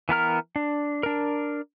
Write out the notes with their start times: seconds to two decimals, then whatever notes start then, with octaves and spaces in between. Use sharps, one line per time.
0.09 E3 B3 A#4 F6
0.56 D4
1.03 D4 A#4